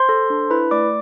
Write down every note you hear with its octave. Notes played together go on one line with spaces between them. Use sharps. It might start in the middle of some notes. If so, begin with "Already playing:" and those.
Already playing: C5 C6
A4
D4
E4 B4 B5
A3 D5 D6